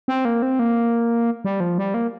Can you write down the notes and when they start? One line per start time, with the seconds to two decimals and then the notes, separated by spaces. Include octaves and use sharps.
0.08 C4
0.25 A#3
0.42 C4
0.59 A#3
1.45 G3
1.60 F3
1.78 G3
1.94 A#3